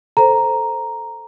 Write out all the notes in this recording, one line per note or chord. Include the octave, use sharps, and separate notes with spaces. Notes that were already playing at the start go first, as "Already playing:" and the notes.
A4 C5 A#5